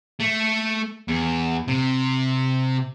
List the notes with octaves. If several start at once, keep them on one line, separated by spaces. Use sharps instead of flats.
A3
E2
C3